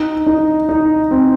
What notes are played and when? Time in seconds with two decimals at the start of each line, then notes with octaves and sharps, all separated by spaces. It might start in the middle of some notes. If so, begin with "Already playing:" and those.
Already playing: D#4
0.27 D#4
0.69 D#4
1.11 C4